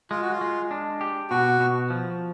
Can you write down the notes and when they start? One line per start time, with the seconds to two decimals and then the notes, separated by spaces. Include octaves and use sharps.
0.11 G#3 F4
0.22 F#4
0.32 F4
0.41 G#3
0.71 D4
1.01 G4
1.30 B2 F#4
1.60 B2
1.90 F3